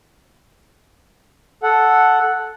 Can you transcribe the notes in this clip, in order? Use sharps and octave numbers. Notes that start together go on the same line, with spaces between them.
A4 F#5